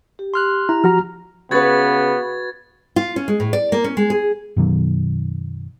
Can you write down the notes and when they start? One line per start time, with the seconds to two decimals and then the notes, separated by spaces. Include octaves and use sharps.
0.19 G4
0.34 C6 F6 F#6
0.69 E4 A#5
0.84 F3 F#4 A#5 F6
1.51 C#3 B3 F#4 B4 G#6 A6
2.96 F4
3.16 C#4
3.28 G#3
3.40 A2
3.53 D5
3.72 A#3
3.84 C#4
3.97 G#3
4.10 G#4
4.57 F#2 B2 D#3 F#3